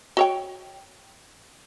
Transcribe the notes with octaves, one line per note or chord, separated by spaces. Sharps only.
F#4 C#5 G5